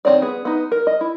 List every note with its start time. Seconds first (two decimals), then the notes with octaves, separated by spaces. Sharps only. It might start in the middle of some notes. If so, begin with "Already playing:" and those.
0.05 D#3 A#3 C4 C#5 D5
0.22 B3 G#4
0.45 B3 D#4
0.72 A#4
0.87 D#5
1.01 E4